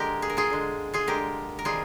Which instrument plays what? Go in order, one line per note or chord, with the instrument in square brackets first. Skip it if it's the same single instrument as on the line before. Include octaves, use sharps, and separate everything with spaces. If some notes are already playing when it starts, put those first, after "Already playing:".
Already playing: [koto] D3 G#3 G4 A#4
G#4
A#4
F4 G#4
D3 G#3
F4 G#4
D3 G#3 G4 A#4
A#4
C3 D#3 G3 F4 G#4